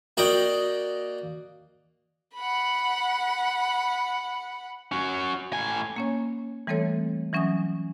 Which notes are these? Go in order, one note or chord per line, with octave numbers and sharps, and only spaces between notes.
A#3 F#4 D5 D#5 G5
F#5 B5
C#4 F#4
A2 G#5
A#3 C#4 C#5
E3 G3 A3 C4 A4 C#5
E3 F#3 C#4 E5 G#5 D#6